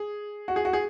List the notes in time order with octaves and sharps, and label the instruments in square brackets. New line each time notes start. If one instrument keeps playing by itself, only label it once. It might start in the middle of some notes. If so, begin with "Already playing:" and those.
Already playing: [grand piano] G#4
F#4
G#4
F#4
G#4